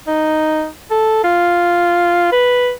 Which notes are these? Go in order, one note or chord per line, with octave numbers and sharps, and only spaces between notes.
D#4
A4
F4
B4